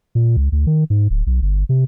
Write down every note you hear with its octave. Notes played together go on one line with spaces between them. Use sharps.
A#2
C#2
D2
D#3
G#2
D1
B1
G1
C3